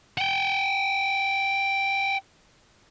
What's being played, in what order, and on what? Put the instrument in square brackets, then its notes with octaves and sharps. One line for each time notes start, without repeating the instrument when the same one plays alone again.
[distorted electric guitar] F#5 G5